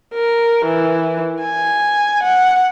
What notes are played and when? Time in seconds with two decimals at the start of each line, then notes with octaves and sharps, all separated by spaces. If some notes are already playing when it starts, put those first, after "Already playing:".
0.14 A#4
0.65 E3
1.41 G#5
2.23 F#5